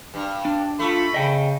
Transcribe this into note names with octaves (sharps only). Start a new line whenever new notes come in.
G2
D4
A3 F4 B5
C#3 D#5 G5